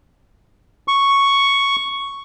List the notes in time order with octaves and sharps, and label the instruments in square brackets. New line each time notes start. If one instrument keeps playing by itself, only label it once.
[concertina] C#6